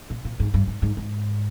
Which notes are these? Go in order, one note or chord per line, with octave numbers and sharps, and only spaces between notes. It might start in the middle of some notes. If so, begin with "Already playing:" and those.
A#2
A#2
G#2
G2
G#2
G#2
G#2